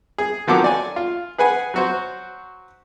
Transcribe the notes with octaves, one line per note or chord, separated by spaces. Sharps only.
G#4
D#3 F3 F#3 A4 F#5 D6
D5 G#5
F4
G#4 B4 F#5 G#5
F#3 F#4 C5